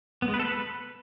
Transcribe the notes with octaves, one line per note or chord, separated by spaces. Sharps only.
B3
G#3
B4
A4
B4